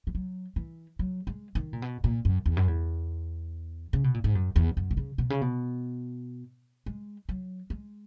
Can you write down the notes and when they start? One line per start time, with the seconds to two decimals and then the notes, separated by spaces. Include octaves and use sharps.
0.07 E3
0.15 F#3
0.56 E3
0.99 F#3
1.27 G#3
1.55 D#3
1.73 A#2
1.82 B2
2.04 A#2
2.25 F#2
2.46 E2
2.57 F#2
2.68 E2
3.93 C#3
4.04 B2
4.14 A#2
4.24 G#2
4.35 F#2
4.56 E2
4.77 F#2
4.91 B2
4.97 C#3
5.18 B2
5.30 C#3
5.42 B2
6.86 G#3
7.29 F#3
7.70 G#3